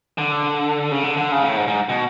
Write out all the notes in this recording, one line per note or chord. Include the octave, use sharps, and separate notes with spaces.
D3
C#3
D3
D3
C#3
G#2
A2
G#2
G#2
B2